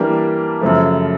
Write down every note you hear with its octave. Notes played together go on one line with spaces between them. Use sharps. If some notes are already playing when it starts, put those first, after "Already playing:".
Already playing: E3 G3 A#3 D4 G4
F#2 C#3 F3 A3